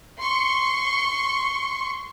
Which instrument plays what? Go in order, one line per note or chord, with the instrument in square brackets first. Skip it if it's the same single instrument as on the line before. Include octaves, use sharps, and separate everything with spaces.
[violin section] C6 C#6